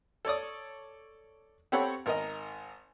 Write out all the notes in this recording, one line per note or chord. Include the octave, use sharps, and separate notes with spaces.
A4 C#5 D5 D#6
C4 G4 A4 C#5 F#5 B5
G#1 A#4 D#5